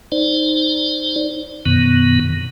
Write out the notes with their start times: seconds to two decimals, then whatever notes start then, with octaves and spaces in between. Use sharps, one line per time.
0.12 D#4 C5 D5
1.66 F#2 B2 D#3 B3